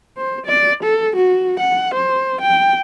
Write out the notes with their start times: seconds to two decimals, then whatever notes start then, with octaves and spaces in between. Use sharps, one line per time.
0.17 C5
0.46 D5
0.83 A4
1.16 F#4
1.60 F#5
1.94 C5
2.41 G5